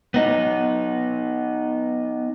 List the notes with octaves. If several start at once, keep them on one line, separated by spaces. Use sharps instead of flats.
B3 D#4